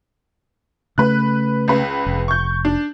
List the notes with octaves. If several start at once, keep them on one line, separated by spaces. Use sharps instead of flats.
C#3 A3 B4 F#6
C#2 B4
F1
C#6 G6
D4